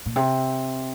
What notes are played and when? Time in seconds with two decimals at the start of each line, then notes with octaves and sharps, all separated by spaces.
0.06 A#2
0.16 C3